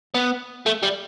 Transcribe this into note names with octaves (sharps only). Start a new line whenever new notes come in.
B3
A3
G3